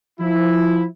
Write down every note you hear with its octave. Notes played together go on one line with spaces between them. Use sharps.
F3 E4